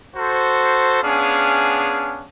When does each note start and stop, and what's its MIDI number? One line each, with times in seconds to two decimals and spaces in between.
0.16 1.00 66
0.16 1.00 69
0.16 1.00 72
1.02 2.27 59
1.02 2.27 61
1.02 2.27 62
1.02 2.27 68
1.02 2.27 77